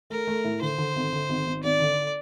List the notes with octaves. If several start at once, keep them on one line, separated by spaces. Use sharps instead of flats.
A3 A#4
A3
A2
D3 C5
D3
G#1
D3
G#1
G#1
G#1 D5
D3